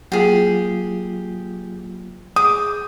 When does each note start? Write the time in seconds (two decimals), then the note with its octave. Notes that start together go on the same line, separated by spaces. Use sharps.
0.12 F#3 A#3 F4 G4 G#4
2.36 G#4 D6 D#6 G6